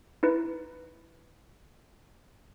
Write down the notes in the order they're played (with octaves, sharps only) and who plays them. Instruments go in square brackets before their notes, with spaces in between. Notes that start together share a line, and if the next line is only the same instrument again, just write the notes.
[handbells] D#4 E4 B4